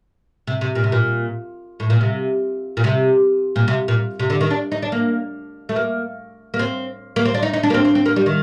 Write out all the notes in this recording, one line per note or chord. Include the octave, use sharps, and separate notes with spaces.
C3
C3
A#2
C3
A#2
A2
A#2
C3
A#2
C3
A#2
C3
A#2
C3
D3
D#3
D4
D#4
D4
A#3
A3
A#3
A#3
C4
A#3
C4
D4
D#4
D#4
D4
A#3
C4
C4
C4
A#3
G3
D#3